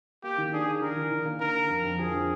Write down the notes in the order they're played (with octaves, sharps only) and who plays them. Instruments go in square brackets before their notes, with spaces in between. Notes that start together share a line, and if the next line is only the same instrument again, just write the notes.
[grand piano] A#3 [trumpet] G4
[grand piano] D#3
[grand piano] D4 [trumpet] G#4
[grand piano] D4
[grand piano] D#3 [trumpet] A#4
[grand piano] D#3
D#3
A#3
[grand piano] D3 [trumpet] A#4
[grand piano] D3
F2
F2
[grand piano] F3 [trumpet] G#4
[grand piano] D3